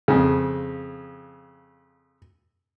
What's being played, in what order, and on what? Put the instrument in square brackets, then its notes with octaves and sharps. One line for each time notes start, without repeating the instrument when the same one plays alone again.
[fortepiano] F2 C#3